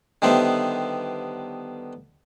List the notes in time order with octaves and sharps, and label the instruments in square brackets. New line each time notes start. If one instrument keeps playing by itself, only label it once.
[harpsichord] D3 D#3 G3 B3 C5 E5